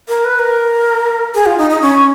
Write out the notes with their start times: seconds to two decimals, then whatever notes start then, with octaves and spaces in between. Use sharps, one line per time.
0.08 A#4
0.25 B4
0.39 A#4
1.35 G#4
1.46 F4
1.58 D#4
1.70 D#4
1.81 C#4